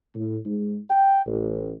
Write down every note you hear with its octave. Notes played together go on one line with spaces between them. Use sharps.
A2
G#2
G5
A1